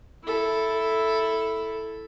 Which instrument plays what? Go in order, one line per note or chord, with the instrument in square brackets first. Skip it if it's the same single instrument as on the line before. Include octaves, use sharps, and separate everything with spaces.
[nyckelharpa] E4 A4